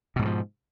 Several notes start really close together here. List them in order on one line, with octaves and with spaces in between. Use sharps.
B2 G#2 D3 F3